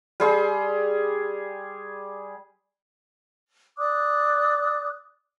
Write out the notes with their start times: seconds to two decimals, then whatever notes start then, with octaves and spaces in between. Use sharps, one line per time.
0.20 G3 G#4 C6
3.77 D5 D6 D#6 F#6